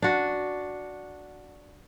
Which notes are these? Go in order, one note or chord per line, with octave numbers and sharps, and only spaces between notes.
D4 F#4